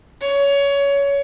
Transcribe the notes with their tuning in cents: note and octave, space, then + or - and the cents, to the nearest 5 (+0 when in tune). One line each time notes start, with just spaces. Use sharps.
C#5 +20